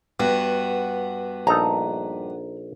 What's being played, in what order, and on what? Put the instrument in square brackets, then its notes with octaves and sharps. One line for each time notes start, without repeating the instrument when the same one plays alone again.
[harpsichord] G2 [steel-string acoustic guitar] B3 F#4
[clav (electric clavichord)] A#1 D#4 A4 [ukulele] A#5